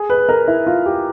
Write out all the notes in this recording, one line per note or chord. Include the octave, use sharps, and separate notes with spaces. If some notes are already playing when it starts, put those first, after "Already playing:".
Already playing: G#4
B4
A#4
E4
F4
G4